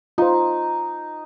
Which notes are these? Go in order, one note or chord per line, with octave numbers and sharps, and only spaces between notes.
D#4 F4 C5